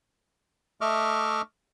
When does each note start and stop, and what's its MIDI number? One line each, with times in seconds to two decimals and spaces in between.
0.81 1.42 57
0.81 1.42 75
0.81 1.42 76
0.81 1.42 85
0.81 1.42 86
0.81 1.42 89